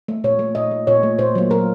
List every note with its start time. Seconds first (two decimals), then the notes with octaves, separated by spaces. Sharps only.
0.08 A3
0.24 A#2 C#5
0.39 A3
0.55 A#2 D#5
0.71 A3
0.87 A#2 C#5
1.03 A3
1.18 A#2 C5
1.35 F#3 A#3
1.50 A#2 A#4